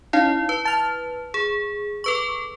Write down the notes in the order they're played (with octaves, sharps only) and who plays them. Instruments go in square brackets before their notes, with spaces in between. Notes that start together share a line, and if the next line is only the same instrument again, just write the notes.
[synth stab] C#4 D#4 F5 [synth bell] E4
[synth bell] B4
[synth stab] A5 F6
[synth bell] G#4
A4 B4 C#6